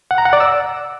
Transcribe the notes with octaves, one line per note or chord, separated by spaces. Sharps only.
F#5
A#5
F#5
D5
E6